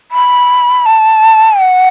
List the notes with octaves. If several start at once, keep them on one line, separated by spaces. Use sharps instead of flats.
B5
A5
F#5